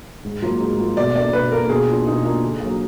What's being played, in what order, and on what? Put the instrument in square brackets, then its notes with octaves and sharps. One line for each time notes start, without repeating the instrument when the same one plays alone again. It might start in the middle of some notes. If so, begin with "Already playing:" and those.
[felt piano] G#2
F#3 A#3 F4
G#2
F#3 A#3 F4
[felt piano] B2 [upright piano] D5
[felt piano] A#3 D4 [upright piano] D5
[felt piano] B2 [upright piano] B4
[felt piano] A#3 D4 [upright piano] A#4
[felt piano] B2 [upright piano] G#4
[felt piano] A#3 D4 F4
[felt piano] B2 [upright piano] D#4
[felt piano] A#3 D4 F4
D3
F#3 A#3